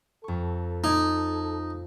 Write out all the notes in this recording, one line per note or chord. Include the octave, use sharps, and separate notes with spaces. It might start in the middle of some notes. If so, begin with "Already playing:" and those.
F2 A4 C#6
D#4 D6 G#6